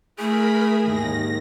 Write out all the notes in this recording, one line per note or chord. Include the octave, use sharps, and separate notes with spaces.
A3 E4 G#4 A#4 B5
D#2 G#2 D#3 A#6